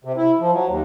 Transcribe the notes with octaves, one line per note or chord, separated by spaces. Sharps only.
C3
E4
F3
F#3
D#2